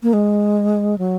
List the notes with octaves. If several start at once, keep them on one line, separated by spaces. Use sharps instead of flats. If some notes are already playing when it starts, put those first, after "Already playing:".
A#3
G#3
F#3